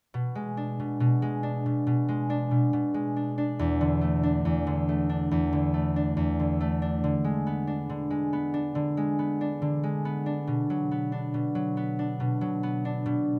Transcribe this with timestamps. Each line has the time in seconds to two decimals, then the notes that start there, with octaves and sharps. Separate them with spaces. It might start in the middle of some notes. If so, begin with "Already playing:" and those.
0.14 B2
0.35 G#3
0.57 D4
0.80 B2
1.00 B2
1.22 G#3
1.43 D4
1.66 B2
1.87 B2
2.09 G#3
2.30 D4
2.51 B2
2.73 B2
2.94 G#3
3.16 D4
3.38 D4
3.59 E2
3.81 D3
4.01 A3
4.23 D4
4.45 E2
4.67 D3
4.89 A3
5.09 D4
5.31 E2
5.53 D3
5.74 A3
5.96 D4
6.17 E2
6.39 D3
6.60 A3
6.82 D4
7.04 D3
7.24 G#3
7.47 B3
7.67 D4
7.89 D3
8.10 G#3
8.33 B3
8.54 D4
8.75 D3
8.97 G#3
9.19 B3
9.41 D4
9.62 D3
9.83 G#3
10.05 B3
10.26 D4
10.47 B2
10.70 F#3
10.91 B3
11.12 D4
11.34 B2
11.55 F#3
11.77 B3
11.99 D4
12.20 B2
12.41 F#3
12.63 B3
12.85 D4
13.06 B2